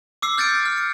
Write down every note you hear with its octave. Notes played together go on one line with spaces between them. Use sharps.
D6 E6 C7
F6 G6 A6 C#7 D7
F6
C#7